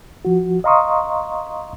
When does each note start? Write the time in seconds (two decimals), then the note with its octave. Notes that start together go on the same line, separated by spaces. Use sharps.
0.25 F3 F#4
0.64 D#5 F5 A#5 C6 C#6 D#6